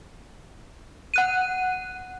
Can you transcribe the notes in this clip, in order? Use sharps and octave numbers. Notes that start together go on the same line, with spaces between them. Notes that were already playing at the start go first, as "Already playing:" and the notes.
F#5 F#6 D#7